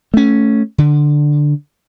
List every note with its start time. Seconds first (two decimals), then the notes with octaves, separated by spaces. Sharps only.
0.14 A3 C#4
0.78 D3